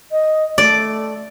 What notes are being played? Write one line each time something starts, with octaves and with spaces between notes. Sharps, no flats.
D#5
A3 D5